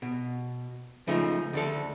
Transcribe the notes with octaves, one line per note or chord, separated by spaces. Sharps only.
B2
C#3 F3 A3 D#4
D2 D4 A4